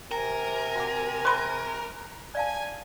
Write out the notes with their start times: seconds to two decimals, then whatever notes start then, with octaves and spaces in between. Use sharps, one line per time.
0.11 C3 A#4 G5 G#5 A#5
0.76 F#4 F#5 D6
1.25 G#4 C5 B5 C6
2.35 D5 F5 G#5 A5